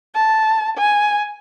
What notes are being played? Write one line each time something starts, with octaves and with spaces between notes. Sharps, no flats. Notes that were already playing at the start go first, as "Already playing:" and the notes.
A5
G#5